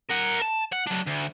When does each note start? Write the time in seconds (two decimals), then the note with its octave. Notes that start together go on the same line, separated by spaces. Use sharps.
0.10 A#4 F#5
0.41 A5
0.72 F#5
0.87 F#3 D4
1.07 D2